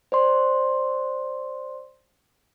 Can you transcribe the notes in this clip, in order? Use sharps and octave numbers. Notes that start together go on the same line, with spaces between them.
C5 D5 C6